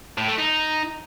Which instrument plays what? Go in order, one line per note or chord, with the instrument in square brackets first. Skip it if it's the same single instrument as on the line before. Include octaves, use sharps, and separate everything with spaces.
[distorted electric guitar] A2
A3
D#4